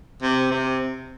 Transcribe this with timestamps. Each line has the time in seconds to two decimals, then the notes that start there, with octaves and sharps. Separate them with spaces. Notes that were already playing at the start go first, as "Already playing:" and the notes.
0.22 C3
0.51 C3